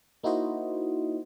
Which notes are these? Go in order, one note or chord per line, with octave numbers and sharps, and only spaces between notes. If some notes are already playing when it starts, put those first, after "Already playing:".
A#3 D#4 E4 F#4 C5 D#5